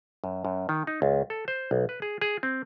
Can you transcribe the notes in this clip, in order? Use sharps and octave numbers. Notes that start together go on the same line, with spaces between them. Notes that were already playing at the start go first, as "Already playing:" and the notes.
F#2
F#2
D#3
D#4
C#2
A4
C5
B1
B4
G#4
G#4
C4